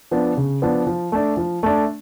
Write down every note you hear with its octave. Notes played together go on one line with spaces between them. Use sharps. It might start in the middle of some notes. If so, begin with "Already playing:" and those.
F3 B3 D4
C#3
F3 B3 D4
F3
A3 D4
F3
A3 D4